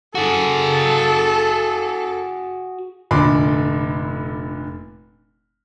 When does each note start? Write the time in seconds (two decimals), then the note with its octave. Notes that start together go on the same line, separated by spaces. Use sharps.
0.15 F#4 G#4 A4
3.11 F1 A#2 D3 B5 C6 D6